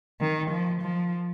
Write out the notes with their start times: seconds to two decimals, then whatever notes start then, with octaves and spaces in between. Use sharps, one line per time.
0.21 D#3
0.50 F3
0.81 F3